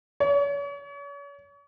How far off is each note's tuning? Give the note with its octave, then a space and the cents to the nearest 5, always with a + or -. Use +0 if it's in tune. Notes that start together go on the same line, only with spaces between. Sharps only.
C#5 +40